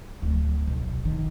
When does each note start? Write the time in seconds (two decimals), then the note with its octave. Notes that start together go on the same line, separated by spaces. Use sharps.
0.22 D1
0.67 B1
1.05 D#3